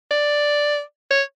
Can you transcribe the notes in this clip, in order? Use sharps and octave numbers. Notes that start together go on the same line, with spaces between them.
D5
C#5